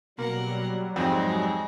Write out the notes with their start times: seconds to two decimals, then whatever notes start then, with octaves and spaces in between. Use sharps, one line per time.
0.18 B2 F#3 G3 A#3 A#4 F#5
0.96 F2 G#2 G#3 C4